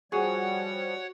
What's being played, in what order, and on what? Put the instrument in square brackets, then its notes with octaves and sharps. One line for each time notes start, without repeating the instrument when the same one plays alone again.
[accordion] F3 G3 [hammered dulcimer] F#4 [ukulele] G#4 [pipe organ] C#5 F#5